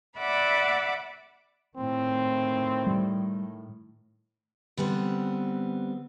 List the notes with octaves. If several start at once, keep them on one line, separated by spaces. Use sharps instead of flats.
D5 E5 F#5 B5 D6
A2 D#3 C4
G3
D3 G3 B3 C4